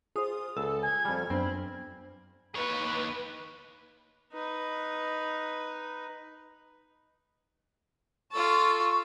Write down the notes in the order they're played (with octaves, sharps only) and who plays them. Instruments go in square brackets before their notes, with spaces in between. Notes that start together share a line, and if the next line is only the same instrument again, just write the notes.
[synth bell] F4 D#6 [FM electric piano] G#4 C5
[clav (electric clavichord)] C#2 [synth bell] A4 [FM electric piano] E6
[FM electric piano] G#5 [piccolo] G#6
[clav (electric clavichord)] F2 G3 [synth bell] F6
[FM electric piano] F#2 B3 D4 [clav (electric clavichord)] C4 [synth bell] C5 [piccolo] B5
[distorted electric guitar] D#2 C#5 [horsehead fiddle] B4
[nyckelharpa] D#4 B4
[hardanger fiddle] F4 A4 [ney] C#6